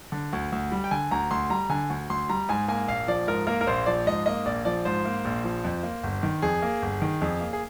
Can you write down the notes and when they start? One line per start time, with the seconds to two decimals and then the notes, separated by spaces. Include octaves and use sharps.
0.12 D3
0.33 D2
0.52 D2
0.72 G3
0.84 G5
0.91 D3 G#5
1.11 D2 A#5
1.31 D2 C6
1.50 G3 A#5
1.70 D3 G#5
1.90 D2
2.10 D2 C6
2.29 G3 A#5
2.49 G#2 G#5
2.68 A#3 G#5
2.88 A#1 F5
3.08 F3 D5
3.27 G#2 A#4
3.47 A#3 A#4
3.61 A#4
3.67 A#1 C5
3.86 F3 D5
4.06 G#2 D#5
4.26 A#3 D#5
4.45 A#1 D5
4.65 F3 D5
4.85 G#2 C5
5.05 A#3
5.25 A#1
5.44 F3
5.64 F2
5.83 A#3
6.03 G1
6.23 D#3
6.42 F2 G#4
6.62 A#3
6.82 G1
7.02 D#3
7.21 F2 G#4
7.41 A#3
7.53 G#4